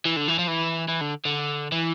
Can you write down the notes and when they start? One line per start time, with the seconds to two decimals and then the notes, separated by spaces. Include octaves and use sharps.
0.05 E3
0.17 D3
0.28 E3
0.39 F3
0.48 E3
0.88 E3
1.01 D3
1.25 D3
1.72 E3